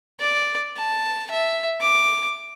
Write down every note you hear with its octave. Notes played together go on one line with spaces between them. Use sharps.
D5
A5
E5
D6